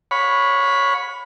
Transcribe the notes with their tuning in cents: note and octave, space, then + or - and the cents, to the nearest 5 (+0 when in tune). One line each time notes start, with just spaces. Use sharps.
C#5 +0 F#5 -45 B5 +0